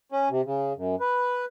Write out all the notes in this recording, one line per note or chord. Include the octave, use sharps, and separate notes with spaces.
C#4
C3
C#3
F#2
B4